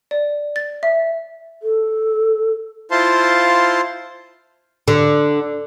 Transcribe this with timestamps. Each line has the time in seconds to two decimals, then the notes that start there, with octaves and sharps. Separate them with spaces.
0.11 D5
0.56 A6
0.83 E5
1.63 A4
2.91 E4 F4 C5 F5 A5 C6
4.88 D3